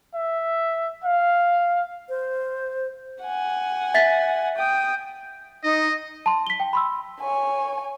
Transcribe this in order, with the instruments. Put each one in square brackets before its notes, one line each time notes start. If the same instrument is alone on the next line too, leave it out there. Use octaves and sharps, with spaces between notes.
[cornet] E5
F5
[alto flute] C5
[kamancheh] F#5 G#5
[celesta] E5 A6 B6
[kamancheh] G5 D#6
[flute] D#4 [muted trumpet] D#5
[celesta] A5 C6
B6 G7
G5
B5 C6 E6
[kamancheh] C#5 G#5